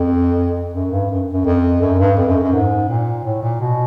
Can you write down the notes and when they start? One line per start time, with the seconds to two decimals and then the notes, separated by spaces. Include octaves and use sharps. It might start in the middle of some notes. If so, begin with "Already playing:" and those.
Already playing: F2
0.74 F#2
0.91 G2
1.10 F#2
1.33 F#2
1.45 F2
1.81 F#2
1.99 G2
2.17 F2
2.28 F#2
2.41 F#2
2.53 G#2
2.88 A#2
3.24 A2
3.42 A#2
3.61 B2